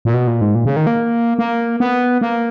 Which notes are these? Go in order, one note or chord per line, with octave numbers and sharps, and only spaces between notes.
A#2
B2
A#2
G#2
A#2
C#3
D#3
A#3
A#3
B3
A#3